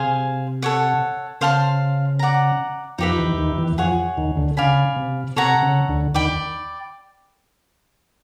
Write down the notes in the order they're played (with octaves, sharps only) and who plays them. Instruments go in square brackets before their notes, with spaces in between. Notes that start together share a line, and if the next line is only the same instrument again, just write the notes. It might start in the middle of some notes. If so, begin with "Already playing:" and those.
Already playing: [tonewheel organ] C3 [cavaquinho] G#4 C5 F5 G#5
[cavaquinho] A4 C#5 F#5
[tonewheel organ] C#3 [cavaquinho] C5 F5 A5 C6
[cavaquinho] D5 F#5 A#5
[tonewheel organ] F2 F3 [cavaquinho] D#4 G4 B4 E5
[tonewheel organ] E2 E3
D#2 D#3
E2 E3
[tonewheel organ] F2 F3 [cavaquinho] G#4 C#5 F#5
[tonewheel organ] D#2 D#3
D2 D3
[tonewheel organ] C#3 [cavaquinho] D5 F5 G#5 B5
[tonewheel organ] C3
[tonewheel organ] C3 [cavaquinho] A4 C#5 F#5 A#5
[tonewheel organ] C#3
D2 D3
[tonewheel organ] D#2 D#3 [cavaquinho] D5 G5 B5